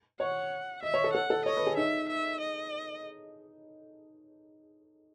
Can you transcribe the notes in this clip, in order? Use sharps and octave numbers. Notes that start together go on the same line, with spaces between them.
C#5 F#5
D#5 E5
C#5
A4
A4 F#5
A4
C#5 D#5
B4
G#4
D#4 E5
E5
D#5